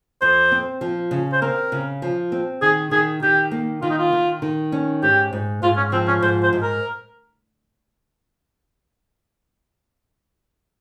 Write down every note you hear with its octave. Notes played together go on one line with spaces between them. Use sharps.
F2 C5
C4
F3
C#3
C5
C4 A#4
C#3
F3
C4
D#3 G#4
D#3 G#4
D#3 G4
A#3
D#3 F4
D#4
F4
D#3
D#3
C#4
G#2 G4
G#2
G#2 F4
C#4
F3 C4
C#4
G#2 C5
C5
G#2
A#4